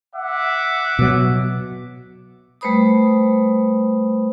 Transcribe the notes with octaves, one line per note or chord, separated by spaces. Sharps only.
E5 F#5 D6
B2 F#3
G3 A3 B4 C5 B5 D#6